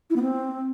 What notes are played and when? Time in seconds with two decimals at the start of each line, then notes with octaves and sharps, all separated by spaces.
0.10 E4
0.16 B3
0.22 C4